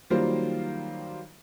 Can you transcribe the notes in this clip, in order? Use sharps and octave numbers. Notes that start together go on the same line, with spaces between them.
D#3 F#3 G3 A#3 F4 C5